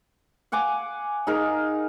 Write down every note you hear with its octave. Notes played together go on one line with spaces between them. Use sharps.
F5 F#5 G#5 D6
D#4 G#4 A#4